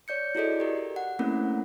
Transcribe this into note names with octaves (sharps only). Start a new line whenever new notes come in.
C#5 D5 G6 C#7
E4 F#4 G#4 A4 D5 D#5
G4 A#4
F#5
A3 A#3 C4 C#4 E4 A#4